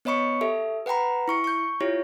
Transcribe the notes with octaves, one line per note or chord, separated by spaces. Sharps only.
B3 C#5 D#5 B5 C#6 C#7
G4 A4 E5
B4 F#5 G5 A#5 B5
E4 C#6 C#7
C#6 G6
E4 F4 G4 C#5